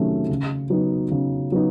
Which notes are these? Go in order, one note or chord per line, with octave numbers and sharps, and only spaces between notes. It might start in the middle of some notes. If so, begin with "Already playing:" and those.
Already playing: C3 D#3 F#3 A3 C#4
C#3
F#3 B3 D#4
C#3
F#3 B3 D#4